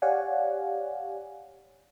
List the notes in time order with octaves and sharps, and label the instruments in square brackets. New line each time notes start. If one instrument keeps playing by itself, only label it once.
[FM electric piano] G4 C#5 D5 F5 F#5 G#5